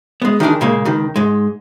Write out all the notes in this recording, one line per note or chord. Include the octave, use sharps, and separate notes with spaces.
G#3 B3
D#3 E3 D4 G#4
A#2 C#3 G#3 A#3
C#2 D#3
G#2 G#3